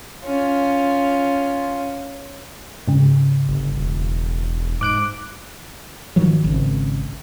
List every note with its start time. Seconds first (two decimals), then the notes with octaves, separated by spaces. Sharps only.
0.25 C#4 F4
2.88 G#2 C#3
3.49 G1
3.78 E1
4.81 G#2 D6 F#6 D7
6.16 G#2 D#3 F3 F#3
6.44 G#1 C#3